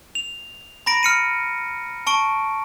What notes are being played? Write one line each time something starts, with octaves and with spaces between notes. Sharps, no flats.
F7
A#5 B5 A#6 D7
F6 C#7 D#7
A5 C#6 D7